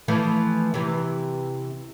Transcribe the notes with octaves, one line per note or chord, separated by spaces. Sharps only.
E3 F3 A3
C3 E3